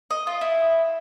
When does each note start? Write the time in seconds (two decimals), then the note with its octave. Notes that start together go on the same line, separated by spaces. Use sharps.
0.11 D#5
0.27 F4
0.41 E4